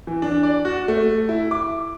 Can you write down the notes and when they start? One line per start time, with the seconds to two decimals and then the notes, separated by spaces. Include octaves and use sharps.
0.07 E3
0.22 D4
0.43 D5
0.65 F#4
0.88 A3
1.29 E4
1.51 D6